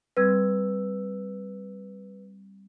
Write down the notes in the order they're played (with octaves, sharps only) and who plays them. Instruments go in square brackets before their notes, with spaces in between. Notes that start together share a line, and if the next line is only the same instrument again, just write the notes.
[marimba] G3 C4 G#6 [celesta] B4 E6